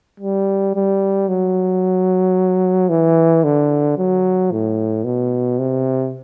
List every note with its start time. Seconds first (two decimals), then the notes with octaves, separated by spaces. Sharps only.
0.20 G3
0.75 G3
1.29 F#3
2.89 E3
3.44 D3
3.98 F#3
4.51 A2
5.04 B2
5.59 C3